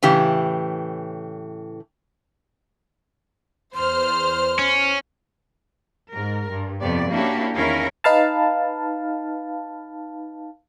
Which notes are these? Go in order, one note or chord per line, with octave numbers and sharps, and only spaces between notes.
A2 C#3 E3 G4
E2 C5 C6 F6
C#4
G#2 A#4
G2
F2 C3 B3 D5
A#3 C#4 D4 E4 F#4 G4
E2 D#3 C#4 E4 A#4 F5
D#4 B4 F5 A5